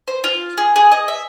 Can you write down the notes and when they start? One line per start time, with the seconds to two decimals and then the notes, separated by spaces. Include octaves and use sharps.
0.08 C5
0.24 F4
0.58 G#4
0.76 G#4
0.92 D#5
1.08 E5